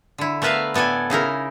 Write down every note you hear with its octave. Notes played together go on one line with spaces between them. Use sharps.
D3 E4
A3 B3 A#4 B4 E5 F5
A2 B3 A4 D5 G#5
C#3 D#4 E4 A#4